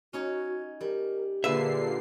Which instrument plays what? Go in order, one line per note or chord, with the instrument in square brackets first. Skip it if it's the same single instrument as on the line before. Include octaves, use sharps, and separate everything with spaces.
[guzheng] C#4 D#4 C#5 [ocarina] F#4
[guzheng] G3 [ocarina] A#4
[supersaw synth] A#2 D3 C7 [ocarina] G#4 [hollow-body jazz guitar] B4 E5